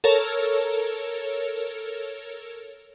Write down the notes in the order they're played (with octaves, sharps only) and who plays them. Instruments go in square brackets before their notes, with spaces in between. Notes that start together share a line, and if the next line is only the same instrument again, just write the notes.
[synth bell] A4 A#4 C#5